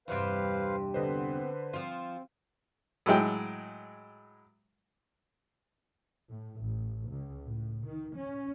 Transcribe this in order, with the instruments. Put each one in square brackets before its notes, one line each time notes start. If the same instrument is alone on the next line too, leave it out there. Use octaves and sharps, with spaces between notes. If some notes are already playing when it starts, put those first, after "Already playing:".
[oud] E2 G2 C3 [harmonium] B4 C5 F5
[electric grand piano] D3 B4 C5 [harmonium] D#5
[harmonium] B3 C4
[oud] F3 F4 [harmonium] C4
[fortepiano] A2 F#3 G#3 G5
[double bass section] A2
A1
C#2
A2
D#3
C#4